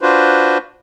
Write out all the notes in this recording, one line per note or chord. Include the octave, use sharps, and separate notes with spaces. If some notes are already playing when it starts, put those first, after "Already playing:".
D4 F4 F#4 B4 C5